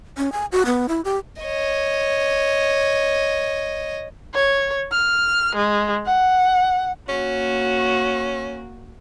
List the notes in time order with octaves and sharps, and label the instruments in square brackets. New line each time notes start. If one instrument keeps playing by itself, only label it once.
[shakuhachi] C#4
G#5
F#4
B3
E4
G4
[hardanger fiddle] C#5 D#5
[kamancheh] C#5
F6
G#3
F#5
[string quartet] A#3 F#4 [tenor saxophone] C#4